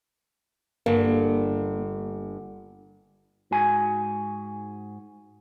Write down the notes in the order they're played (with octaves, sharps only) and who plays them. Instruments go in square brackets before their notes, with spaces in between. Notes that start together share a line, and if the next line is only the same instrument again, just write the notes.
[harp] G1 [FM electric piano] A#3
[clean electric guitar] G#2 F#4 G#5